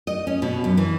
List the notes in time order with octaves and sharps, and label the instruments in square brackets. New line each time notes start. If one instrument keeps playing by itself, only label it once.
[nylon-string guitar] D#5
C#4
B2
F#2
E3